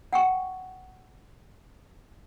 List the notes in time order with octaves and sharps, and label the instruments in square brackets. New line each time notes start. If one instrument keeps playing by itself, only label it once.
[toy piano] F#5 G5 C#6